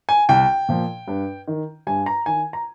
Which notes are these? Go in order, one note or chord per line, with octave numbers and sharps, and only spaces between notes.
G#5
C2 G5
A#2 F3
G2
D#3
G2 G#5
A#5
D#3 G#5
A#5